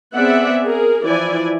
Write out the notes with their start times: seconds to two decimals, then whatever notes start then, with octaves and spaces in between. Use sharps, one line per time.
0.15 B3 C4 G#4 D5 E5 F#5
0.64 G#4 A#4
1.04 E3 F3 E4 D5 G#5